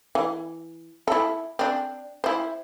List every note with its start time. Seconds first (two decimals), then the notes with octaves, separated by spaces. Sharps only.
0.15 E3
1.08 E4 A4
1.59 C4 D4
2.24 E4 C5